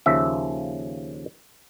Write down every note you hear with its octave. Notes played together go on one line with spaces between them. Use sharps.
D#2 C#3 F3 E5